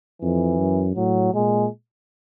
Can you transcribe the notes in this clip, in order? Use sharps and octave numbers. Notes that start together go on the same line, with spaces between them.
F2 E3
F#2
A2 F#3
A#2 G#3